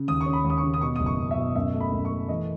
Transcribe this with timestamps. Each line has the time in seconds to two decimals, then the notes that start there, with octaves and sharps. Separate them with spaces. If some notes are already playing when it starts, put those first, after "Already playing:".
Already playing: C#3
0.08 D#2 D#6
0.21 C#6
0.26 C#4
0.33 B5
0.44 D#2
0.50 D#6
0.58 C#6
0.63 C#3
0.74 D#6
0.81 B2 C#6
0.96 F#1 D#6
1.06 C#6
1.18 F#1
1.31 E5
1.37 B2
1.55 F#2 E5
1.74 A3
1.80 B5
1.92 F#2
2.05 C#6
2.11 A3
2.29 E3 D#5